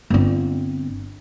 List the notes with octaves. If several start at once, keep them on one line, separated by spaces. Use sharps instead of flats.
G1 C4